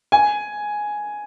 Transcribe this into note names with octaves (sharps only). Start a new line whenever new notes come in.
G#5